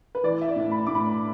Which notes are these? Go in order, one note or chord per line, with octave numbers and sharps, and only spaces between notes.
B4
E3 D5
E5
D5
A2
B5
A2 D6
B5